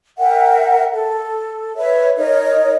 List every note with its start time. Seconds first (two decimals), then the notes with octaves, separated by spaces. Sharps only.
0.18 A#4 E5 F#5 G5
0.92 A4
1.77 B4 C#5 E5
2.18 D#4 A#4 C#5 D#5